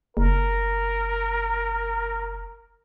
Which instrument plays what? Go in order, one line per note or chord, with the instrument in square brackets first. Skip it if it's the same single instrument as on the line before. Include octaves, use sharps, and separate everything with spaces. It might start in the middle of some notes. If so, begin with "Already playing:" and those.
[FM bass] F#1 [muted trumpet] A#4